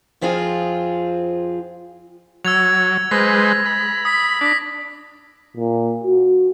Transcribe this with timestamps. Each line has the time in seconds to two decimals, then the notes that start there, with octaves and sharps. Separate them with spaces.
0.21 F2 F3 C4 F4 G#4
2.45 F#3 E6 G#6 F7
3.11 G#3 B4 C5 A#6
3.66 B5
4.05 D#6 B6
4.41 D4 A#6 B6
5.57 A#2
6.04 F#4